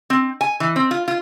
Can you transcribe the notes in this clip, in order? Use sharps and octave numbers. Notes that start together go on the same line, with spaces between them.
C4
G#5
E3
C4
F4
F4